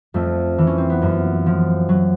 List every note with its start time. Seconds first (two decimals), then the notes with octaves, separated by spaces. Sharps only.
0.14 F2 A3
0.58 E3
0.67 C#4
0.78 C4
0.90 B3
1.02 F#2 A#3
1.46 F3
1.89 F#3